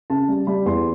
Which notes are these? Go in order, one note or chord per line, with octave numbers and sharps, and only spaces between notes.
C#3 A5
G3
G3 B5
E2 C6